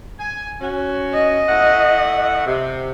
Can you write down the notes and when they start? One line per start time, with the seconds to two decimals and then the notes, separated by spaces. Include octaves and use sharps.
0.19 G#5
0.61 C#4 F#4
1.14 D#5
1.49 A3 E4 F#5
2.47 C3